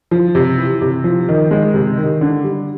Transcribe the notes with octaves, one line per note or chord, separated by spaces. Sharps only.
F3
C3
E3
C3
F3
D#3
G#3
C3
D#3
D3
G3